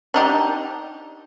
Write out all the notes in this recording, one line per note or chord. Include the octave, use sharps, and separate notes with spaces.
D4 D#4 G4